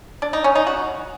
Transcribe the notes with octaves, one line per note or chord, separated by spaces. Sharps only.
D4
D#4
C#4
D#4
F#4